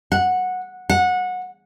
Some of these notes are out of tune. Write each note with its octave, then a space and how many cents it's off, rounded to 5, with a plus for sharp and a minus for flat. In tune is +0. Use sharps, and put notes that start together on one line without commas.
F#5 -10
F#5 -20